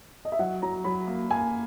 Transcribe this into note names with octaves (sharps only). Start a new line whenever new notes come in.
D#5
E5
F#3 F#5
F#3 A#5
F#3 B5
A#3
A#3 G#5